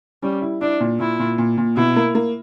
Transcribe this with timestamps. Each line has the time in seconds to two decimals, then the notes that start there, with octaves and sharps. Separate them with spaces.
0.23 G3 C#4
0.42 E4
0.61 D4 E4
0.80 A#2
1.00 A#2 E4
1.19 A#2
1.38 A#2
1.58 A#2
1.77 B2 E4
1.96 A#3
2.15 A#3